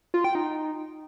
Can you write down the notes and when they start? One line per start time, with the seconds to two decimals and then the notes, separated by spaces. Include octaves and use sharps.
0.14 F4
0.24 G5
0.35 D#4